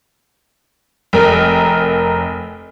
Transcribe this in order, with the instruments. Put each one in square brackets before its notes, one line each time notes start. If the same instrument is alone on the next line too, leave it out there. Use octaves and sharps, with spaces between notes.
[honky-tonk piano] F1 A#4